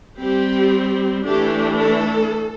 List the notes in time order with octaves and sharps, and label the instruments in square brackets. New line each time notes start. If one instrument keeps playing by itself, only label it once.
[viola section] G3 C4 G4
E3 A3 D4 G4
A4